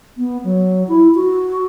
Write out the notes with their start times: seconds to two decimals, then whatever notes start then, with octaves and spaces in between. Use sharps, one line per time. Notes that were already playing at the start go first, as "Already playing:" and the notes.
0.18 B3
0.44 F#3
0.88 E4
1.15 F#4